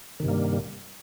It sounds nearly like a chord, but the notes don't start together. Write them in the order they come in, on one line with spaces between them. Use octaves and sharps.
D#3 C3 G2 A#3 G3